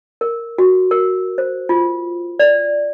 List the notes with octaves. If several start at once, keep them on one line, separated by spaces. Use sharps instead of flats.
A#4
F#4
A#4
C5
F4
D5